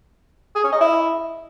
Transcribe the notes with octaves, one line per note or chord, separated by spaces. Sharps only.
G#4
C#4
D#5
E4